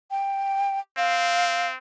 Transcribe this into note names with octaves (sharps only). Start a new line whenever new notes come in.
G5
C4 F5